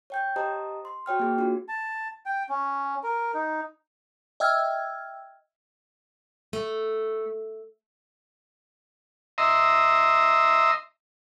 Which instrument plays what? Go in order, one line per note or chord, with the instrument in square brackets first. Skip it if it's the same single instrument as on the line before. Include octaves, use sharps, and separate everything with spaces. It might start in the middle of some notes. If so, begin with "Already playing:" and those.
[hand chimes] C#5 G5 G6
G4 C5 D#5 A5 A#5 D#6
C6
F#4 C#5 G5 F6
A#3 G#4
D4 F4 F#4
[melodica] A5
G5
C#4
A#4
D#4
[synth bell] D#5 E5 G5 E6 F6 G#6
[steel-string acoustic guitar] A3
[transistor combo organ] D#5 E5 A#5 C6